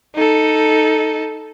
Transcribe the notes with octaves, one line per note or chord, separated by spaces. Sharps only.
D#4 A4